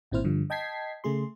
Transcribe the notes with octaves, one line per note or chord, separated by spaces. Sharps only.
G#1 A#2 C4 E4 C5 F6
G2 D3 F3
D#5 G5 A5 G#6 B6 C7
C#3 A3 G#4 C6